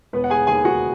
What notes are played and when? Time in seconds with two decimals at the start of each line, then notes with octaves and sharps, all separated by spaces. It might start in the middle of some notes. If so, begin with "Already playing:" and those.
0.13 E1 B3 B4
0.24 F#5
0.30 G#4 G#5
0.47 D#2 G#4 G#5
0.65 F#4 F#5